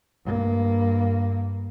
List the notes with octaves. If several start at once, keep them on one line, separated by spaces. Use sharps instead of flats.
G2 A#3